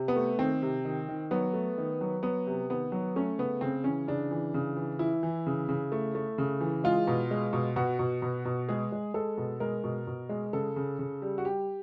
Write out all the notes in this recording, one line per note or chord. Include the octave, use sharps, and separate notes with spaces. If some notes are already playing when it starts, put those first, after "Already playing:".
Already playing: C3
B3
A3
D#3 C4
C3
D#3
D#3
F#3 B3
A3
D#3
F#3
F#3 B3
C3
D#3 B3
F#3
A3 C#4
C#3 B3
C#3 C4
E3 C#4
C#3 D4
E3
C#3
E3
E3 E4
E3
C#3
C#3
A3
A3
C#3
E3
G#3 F4
B2
G#3
B2
B2 F#4
B2
B2
B2
G#3 G#4
G#3
G#3 A4
B2
G#3 A#4
B2
B2
G#3
C#3 A4
C#3
C#3
G3
F#4
G3 G4